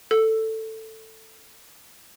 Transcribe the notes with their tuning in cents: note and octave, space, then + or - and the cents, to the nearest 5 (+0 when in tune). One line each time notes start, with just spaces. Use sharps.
A4 +10